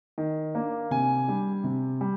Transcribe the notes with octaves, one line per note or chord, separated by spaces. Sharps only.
D#3
A#3 D4
C3 G#5
G3 D4
C3
G3